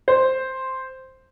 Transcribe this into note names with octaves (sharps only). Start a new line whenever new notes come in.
C5